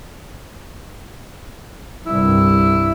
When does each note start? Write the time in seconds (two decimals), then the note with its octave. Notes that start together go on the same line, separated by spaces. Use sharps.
2.06 C2 G2 E4